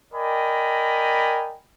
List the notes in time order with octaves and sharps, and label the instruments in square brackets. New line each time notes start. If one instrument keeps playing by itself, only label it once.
[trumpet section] A#4 D5 D#5 G5 G#5 B5